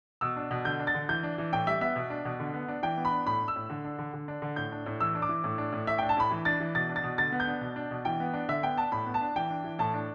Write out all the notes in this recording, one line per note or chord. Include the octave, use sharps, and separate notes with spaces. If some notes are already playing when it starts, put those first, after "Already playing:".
B2 E6
D4
B2
D3 G6
D4
A6
D3
E3 G6
D4
E3
A2 G5
G3 E5
B3 E5
B2
D4
B2
D3
B3
D4
E3 G5
B3
B5
D4
A2 B5
D4
E6
A2
D3
D4
D3
D3
D4
D3
A2 G6
D4
A2
E3 E6
D4
D6
E3
A2
D4
A2
A2 E5
D4 G5
A5
A2 B5
E3
D4 A6
E3
B2 A6
D4
A6
B2
D3 A6
B3
G6
D4
B2
D4
B2
E3 G5
B3
D4
D3 E5
B3 G5
D4 A5
A2 B5
B3
A5
D4
E3 G5
D4
E3
A2 A5
D4